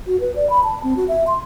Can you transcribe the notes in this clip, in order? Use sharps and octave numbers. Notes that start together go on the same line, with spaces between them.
F#4
B4
D5
B5
A5
C4
F#4
E5
C6